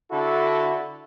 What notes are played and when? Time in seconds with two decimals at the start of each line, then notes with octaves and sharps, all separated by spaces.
0.10 D3 E4 F#4 A4